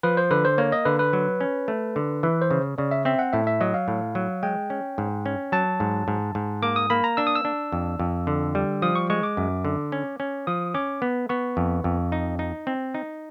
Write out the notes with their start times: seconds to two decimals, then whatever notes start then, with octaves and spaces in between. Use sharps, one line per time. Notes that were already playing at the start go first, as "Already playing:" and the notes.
0.03 F3 B4
0.17 C5
0.31 D3 B4
0.45 C5
0.58 A#3 C#5
0.72 D#5
0.85 D3 B4
0.99 B4
1.13 F#3
1.41 C#4
1.68 A3
1.96 D3
2.23 E3 B4
2.42 C5
2.51 C#3
2.78 C#3 D5
2.91 E5
3.05 C4 E5
3.19 F#5
3.33 A2 E5
3.47 E5
3.61 F#3 D#5
3.74 F5
3.88 A2
4.15 F#3
4.43 G#3 G5
4.70 C#4
4.98 G#2
5.26 C#4
5.52 F#3 A5
5.80 G#2
6.08 G#2
6.35 G#2
6.62 A#3 D6
6.76 D#6
6.90 A#3 B5
7.04 A#5
7.17 D4 E6
7.27 D#6
7.36 E6
7.45 D4
7.72 F2
7.99 F2
8.27 D3
8.55 G3
8.82 F3 D#6
8.95 C#6
9.10 G#3 C#6
9.23 D6
9.37 F#2
9.65 D3
9.92 C#4
10.20 C#4
10.47 F3 D#6
10.74 C#4 D6
11.02 B3
11.29 B3 C#6
11.57 F2
11.84 F2
12.12 D#4
12.39 D#4
12.67 C4
12.94 D#4